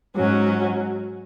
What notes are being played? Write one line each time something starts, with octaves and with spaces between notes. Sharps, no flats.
G#2 F#3 C#4 F#4